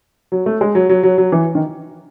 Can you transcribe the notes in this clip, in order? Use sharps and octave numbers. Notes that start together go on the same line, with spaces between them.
F#3
A3
G#3
F#3
F#3
F#3
F#3
E3
D#3